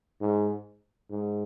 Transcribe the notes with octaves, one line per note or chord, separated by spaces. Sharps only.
G#2
G#2